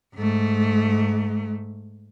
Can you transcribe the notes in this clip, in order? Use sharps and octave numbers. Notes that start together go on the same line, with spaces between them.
G#2 A3